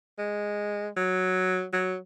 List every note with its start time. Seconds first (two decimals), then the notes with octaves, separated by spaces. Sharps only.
0.19 G#3
0.96 F#3
1.73 F#3